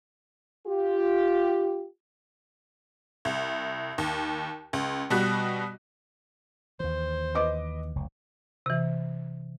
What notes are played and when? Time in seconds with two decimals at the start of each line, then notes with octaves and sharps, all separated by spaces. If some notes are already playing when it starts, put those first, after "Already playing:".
0.66 F4 G4
3.25 C2
3.98 D#2
4.73 C#2
5.10 B2 G3 F#4 F#6
6.80 D#2 E3 C5
7.35 B4 D#5 D6
7.95 F1 C#2
8.66 C3 E3